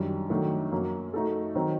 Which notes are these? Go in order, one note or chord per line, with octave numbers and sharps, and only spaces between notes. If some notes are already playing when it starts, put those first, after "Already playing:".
Already playing: F#2 D#3 G3 D4
D#3 F#3 A3 D4
F#2 F#3 A#3
A3 D#4 F#4 A4
D#3 F#3 C4 D#4